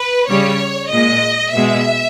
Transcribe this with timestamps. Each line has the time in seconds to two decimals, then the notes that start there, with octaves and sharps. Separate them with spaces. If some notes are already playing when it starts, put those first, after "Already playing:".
Already playing: B4
0.28 C#3 G3 C#5
0.91 A#2 G#3 D#5
1.54 B2 G#3 E5